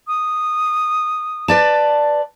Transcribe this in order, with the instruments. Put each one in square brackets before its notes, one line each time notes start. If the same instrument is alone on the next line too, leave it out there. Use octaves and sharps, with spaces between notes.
[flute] D#6
[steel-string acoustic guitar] B4 D5 A5